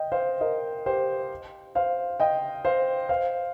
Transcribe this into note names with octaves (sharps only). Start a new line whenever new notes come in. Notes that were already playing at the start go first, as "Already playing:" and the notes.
Already playing: D#5 G5
C5 F5
A#4 D#5
G4 C5
C5 F5
D#5 G5
C5 F5
C5 F5